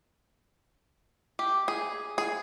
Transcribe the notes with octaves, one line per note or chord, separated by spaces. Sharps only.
G4
G#4
G#4